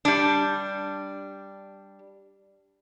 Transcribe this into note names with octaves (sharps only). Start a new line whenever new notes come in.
G3 D4